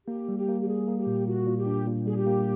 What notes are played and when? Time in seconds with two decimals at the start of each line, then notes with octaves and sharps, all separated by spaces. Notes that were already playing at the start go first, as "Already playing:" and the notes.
0.07 A#3 G4
0.28 G3
0.38 G4
0.48 A#3
0.61 G4
0.67 G3 G#4
0.87 A#3
0.98 G4
1.06 A#2
1.27 A#2 F#4
1.47 A#2
1.57 G4
1.67 D4
1.87 A#2
2.06 G3 G#4
2.16 G4
2.26 A#3